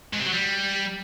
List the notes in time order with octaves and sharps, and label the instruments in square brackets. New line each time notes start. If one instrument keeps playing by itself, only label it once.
[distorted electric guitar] G#2
C3
F#3
G3